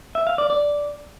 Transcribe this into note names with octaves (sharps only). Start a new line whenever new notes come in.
E5
F5
D5
D5